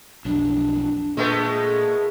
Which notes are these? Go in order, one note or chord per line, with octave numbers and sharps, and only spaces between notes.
B1 F2 D4
A#2 G#3 A3 B3